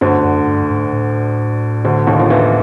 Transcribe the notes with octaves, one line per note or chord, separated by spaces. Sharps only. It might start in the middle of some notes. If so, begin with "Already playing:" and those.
D2 G2 D3
F#2
G2
G#2
A2
D2 D3
D#2 D#3
F3
E2 E3